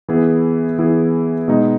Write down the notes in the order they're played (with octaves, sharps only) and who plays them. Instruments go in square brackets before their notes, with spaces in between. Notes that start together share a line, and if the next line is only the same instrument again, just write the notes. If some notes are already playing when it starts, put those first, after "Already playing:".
[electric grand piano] E3 B3 E4 G#4
E3 B3 E4 G#4
B2 G#3 D#4